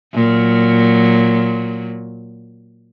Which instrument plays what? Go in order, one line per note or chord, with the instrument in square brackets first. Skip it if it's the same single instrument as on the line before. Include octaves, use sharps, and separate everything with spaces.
[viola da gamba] A#2 F#3